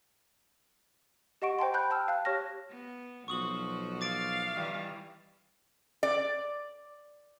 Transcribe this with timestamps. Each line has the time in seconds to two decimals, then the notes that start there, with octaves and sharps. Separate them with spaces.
1.42 G4 D#5 F#5 C#6 D7
1.59 C5 G5 A5 C6
1.74 G5 B5 F#6 G6
1.90 G5 A5 E6 F6
2.08 F5 A5 F#6
2.25 G4 C#5 C#6 F6 A#6
2.70 B3
3.28 B1 F3 F#4 C5 C#6 D#6 F#7
4.01 F5 D6 A6 D7
4.55 D#3 E3 G3
6.03 D5